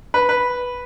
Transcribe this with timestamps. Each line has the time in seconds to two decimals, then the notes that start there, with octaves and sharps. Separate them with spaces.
0.14 B4
0.29 B4